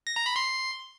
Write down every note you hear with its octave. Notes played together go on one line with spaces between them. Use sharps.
A#6
A#5
B5
C6